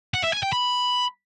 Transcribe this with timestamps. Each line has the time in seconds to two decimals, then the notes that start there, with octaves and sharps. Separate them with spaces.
0.14 F#5
0.24 E5
0.33 G#5
0.43 G5
0.53 B5